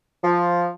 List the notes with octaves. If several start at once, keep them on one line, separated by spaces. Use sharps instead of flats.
F3